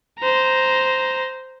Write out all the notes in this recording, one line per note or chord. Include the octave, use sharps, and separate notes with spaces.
C5 A#5